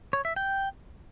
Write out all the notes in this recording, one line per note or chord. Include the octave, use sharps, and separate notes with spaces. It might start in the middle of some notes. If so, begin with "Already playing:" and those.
C#5
E5
G5